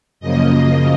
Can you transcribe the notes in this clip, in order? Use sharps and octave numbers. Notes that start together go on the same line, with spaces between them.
F#2 C#3 F3 A#3 D#5